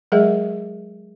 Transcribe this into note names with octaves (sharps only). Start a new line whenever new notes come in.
F#3 G#3 G#4 A#4 E5